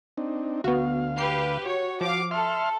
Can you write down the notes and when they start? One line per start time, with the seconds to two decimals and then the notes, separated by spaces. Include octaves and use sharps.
0.18 C4 D4 D#4
0.64 D2 B3 F#4 F5
1.18 G4 B4 C7
1.65 F#4 C#5
2.01 F3 F5 D6
2.31 A4 E5 C6 F6